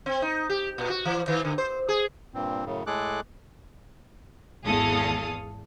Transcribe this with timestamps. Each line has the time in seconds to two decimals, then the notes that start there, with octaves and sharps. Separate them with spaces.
0.06 C4
0.22 D#4
0.50 G4
0.78 A#2
0.90 F#4
1.05 E3
1.28 D#3
1.45 D3
1.58 C5
1.89 G#4
2.34 G2 A#2 C4
2.65 F#2 A2 C#3
2.87 A2 G#3 G#4 A4 D6 F#6
4.65 G#1 E2 G#4 A4 F5 D#6